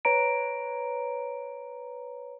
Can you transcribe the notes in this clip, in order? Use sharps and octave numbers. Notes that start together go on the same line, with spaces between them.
B4 C#5 A#5 D7